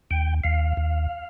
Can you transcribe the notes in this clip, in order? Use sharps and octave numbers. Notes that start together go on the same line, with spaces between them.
D#2 G5
D#2 F5
D#2